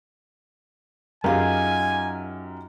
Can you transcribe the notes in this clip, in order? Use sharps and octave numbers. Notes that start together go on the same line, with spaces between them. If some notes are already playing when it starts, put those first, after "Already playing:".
F#2 D#4 F4 G4 G#4 A#4 G#5